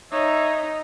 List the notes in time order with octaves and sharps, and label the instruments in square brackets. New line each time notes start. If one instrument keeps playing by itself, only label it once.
[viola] D#4 [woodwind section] C#5 E5